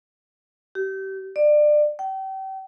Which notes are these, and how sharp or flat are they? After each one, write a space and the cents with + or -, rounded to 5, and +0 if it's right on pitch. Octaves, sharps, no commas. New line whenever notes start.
G4 -30
D5 +25
G5 -35